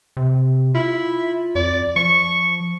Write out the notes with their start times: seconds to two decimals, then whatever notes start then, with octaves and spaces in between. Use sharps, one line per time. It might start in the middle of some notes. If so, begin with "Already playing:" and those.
0.17 C3
0.75 E4 F4
1.55 F2 D5
1.96 F3 C#6